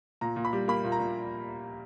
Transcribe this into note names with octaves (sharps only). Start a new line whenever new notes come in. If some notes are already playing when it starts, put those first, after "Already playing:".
A#2 A#5
A#2
B5
G3
A#3 B5
A#2
A#5
A#2